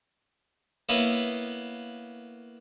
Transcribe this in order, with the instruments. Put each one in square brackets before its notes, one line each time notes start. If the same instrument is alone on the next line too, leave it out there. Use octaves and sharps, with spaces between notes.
[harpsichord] A#3 B3 C#4 E4 B4